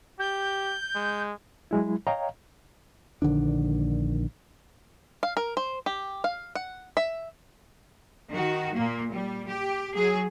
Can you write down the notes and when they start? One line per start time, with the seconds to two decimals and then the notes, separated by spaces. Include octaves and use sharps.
0.19 G4 G6
0.95 G#3
1.71 F#3 G#3 E4
2.07 C#5 D#5 F5 G5 A#5
3.22 A#1 D3 D#3 D4
5.23 F5
5.37 A#4
5.57 C5
5.86 G4
6.24 F5
6.55 F#5
6.97 E5
8.31 D#3 F#4
8.75 A#2 A#3
9.12 G3
9.48 G4
9.94 F#3 G#4